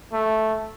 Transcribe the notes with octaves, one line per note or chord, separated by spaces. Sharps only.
A3